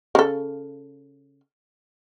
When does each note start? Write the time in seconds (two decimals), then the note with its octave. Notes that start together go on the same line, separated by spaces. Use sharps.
0.15 C#3 A4